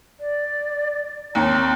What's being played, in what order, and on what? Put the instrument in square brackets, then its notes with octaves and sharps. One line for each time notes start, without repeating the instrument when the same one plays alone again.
[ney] D5
[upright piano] D#2 [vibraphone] C4 C#5 [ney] A#5